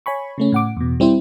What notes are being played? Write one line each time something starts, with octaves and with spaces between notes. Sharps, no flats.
C#5 G#5 B5 C#6
C#3 A3 C#4
A2 F#5 D6
E2 B2
G3 C4 E4 C5